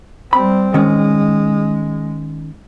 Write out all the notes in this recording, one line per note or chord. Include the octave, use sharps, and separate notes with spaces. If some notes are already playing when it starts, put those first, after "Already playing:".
G3 C4 B5
D#3 G#3 C#4